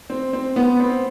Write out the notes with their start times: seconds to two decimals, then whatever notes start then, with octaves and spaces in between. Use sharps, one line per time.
0.10 C4
0.33 C4
0.56 B3
0.80 C4